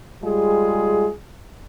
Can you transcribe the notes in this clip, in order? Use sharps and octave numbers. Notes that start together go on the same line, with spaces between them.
G3 G#3 F4 G#4